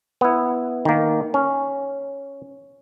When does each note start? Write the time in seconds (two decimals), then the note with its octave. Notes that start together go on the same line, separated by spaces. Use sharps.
0.21 B3 E4
0.85 D#3 A#3
1.34 C#4